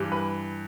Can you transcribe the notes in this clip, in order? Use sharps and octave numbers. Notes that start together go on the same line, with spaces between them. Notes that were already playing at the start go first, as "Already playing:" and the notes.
Already playing: G2 E3 G3
B4